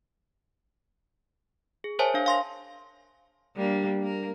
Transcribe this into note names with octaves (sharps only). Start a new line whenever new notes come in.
G#4
A#4 C5 C#5 E5 G#5 A5
D4 F5
F5 C6 A#6
G3 A#3 D4
A#3 A#4